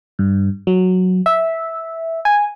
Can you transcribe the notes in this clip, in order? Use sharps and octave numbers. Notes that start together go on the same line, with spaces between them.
G2
F#3
E5
G#5